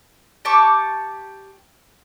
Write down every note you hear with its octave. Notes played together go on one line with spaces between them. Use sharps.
G4 A5 C#6 D6